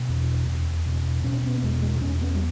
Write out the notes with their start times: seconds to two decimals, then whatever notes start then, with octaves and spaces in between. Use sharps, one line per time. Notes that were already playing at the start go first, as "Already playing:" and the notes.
Already playing: B2
0.09 E2
0.47 E2
0.86 B2
1.24 B2 C#4
1.44 B3
1.63 E2 G#3
1.82 G#3
2.01 E2 C#4
2.21 B3
2.34 G3